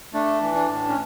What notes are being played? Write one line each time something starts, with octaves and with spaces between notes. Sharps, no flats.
A3 D4
E3
D4
A2
C#4